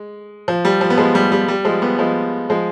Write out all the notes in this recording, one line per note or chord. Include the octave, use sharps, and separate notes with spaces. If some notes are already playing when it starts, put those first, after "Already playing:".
Already playing: G#3
F3
G3
F3
B3
F3 G#3
G3
G3
G3
F3 G#3
G3 B3
F3 G#3
F3 G#3